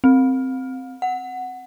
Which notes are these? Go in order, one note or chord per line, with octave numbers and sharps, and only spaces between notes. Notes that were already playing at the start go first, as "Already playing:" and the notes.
C4
F#5